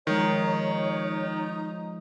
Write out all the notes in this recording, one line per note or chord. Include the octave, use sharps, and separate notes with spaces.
D#3 F3 G#3 D#4 C#5